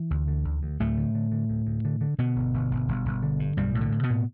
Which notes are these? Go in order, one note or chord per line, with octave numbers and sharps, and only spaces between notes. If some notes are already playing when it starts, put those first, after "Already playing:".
Already playing: E3
D2
D3
D2
D2
D2 A2 A3
D3
D3
D3
D2
D2
D3
D3
B2 D3 B3
G1
G1
G1
G1
G1
D3
G2
B1 G2 G3
A2
D3
A2
B2 B3
A2